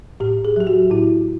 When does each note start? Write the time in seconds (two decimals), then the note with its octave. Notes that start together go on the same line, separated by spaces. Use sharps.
0.20 A2 G4
0.45 G#4
0.56 F#3 G4
0.67 F#4
0.90 A2 E4